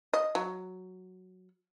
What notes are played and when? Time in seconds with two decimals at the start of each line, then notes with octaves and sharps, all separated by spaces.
0.13 D#5
0.35 F#3